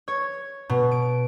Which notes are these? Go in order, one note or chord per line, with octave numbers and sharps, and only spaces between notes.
C#5
B2
D7